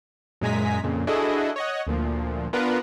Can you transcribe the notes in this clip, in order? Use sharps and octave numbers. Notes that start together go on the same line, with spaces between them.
F#2 A#2 G#3 G#5 A#5 B6
F2 A#2 C#3
D4 E4 F#4 G#4 A4 D#5
C#5 D#5 F#5
D2 A#2 F3
B3 D4 F4 A#4 B4 F#5